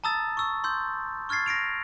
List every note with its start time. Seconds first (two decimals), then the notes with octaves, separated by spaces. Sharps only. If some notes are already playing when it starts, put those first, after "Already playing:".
0.04 A5 A#5 D#6 E6 A6
0.37 C#6 E6
0.64 C6 E6 G6
1.29 C#6 F6 G#6 A6 C7
1.46 A#6 C7 D7 F7